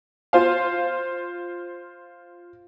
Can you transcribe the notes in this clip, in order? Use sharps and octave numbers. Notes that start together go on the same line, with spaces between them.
F4 C5 F5